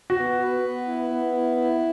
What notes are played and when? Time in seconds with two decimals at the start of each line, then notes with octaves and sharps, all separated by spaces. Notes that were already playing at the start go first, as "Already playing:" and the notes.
0.10 F#4
0.17 B3
0.40 B4
0.64 B3
0.88 E4
1.11 B3
1.33 E4
1.56 E4